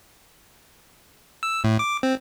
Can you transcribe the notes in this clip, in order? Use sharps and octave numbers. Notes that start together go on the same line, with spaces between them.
E6
A2
D6
C4